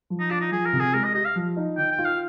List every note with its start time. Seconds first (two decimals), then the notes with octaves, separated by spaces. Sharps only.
0.10 F3
0.20 D#4
0.30 D4 F4
0.41 D#4
0.52 F3 G#4
0.66 A#4
0.73 C3
0.80 G#4
0.94 G#3 A#4
1.04 D#5
1.14 G4 D#5
1.25 F5
1.36 F3
1.57 D#4
1.78 D#3 G5
1.91 G5
1.98 F4
2.05 F5